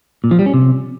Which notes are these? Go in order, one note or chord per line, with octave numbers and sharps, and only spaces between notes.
A#2
F3
G3
C#4
C3